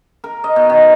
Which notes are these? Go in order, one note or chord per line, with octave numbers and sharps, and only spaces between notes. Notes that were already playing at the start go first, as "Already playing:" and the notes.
A#4
D#5
B2
D#3